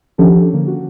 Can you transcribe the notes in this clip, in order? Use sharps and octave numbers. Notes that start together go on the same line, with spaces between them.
D#3 F3 C#4 D4 G4 A4
D3 A#3
F#4